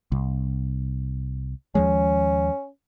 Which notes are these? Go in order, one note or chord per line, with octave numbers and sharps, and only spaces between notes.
C2
D#2 F3 G#3 C#4